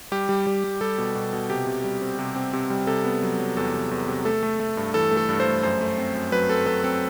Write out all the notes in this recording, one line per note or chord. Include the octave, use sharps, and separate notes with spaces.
G3 G4
G3
G3
G3
G3 A4
B2
B2
B2
C3 G4
C3
G3
C4
C3
C4
C3
G3
C3 A4
B3
F#3
F#3
E2 A4
C3
E2
C3
A3 A4
A3
A3
G2
E3 A4
A3
A4
G2
C5
A3
F#2 C5
A3
C4
F#2
F#3 B4
C4 A4
F#3 A4
C4 A4